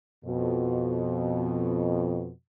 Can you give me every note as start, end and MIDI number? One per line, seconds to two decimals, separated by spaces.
0.24 2.30 41
0.24 2.30 47